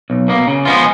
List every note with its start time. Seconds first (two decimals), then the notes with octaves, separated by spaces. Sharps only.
0.10 B1
0.28 B2 A#3
0.47 C#3
0.65 F3 G#3 B3 F4